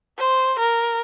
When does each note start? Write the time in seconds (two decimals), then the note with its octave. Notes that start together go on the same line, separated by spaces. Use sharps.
0.18 C5
0.59 A#4